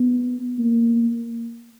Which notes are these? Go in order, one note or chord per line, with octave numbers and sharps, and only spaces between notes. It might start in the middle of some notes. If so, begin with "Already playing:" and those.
Already playing: B3
A#3